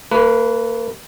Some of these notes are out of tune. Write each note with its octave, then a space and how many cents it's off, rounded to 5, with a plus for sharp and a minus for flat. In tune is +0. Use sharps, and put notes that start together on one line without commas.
A#3 -35 B4 +0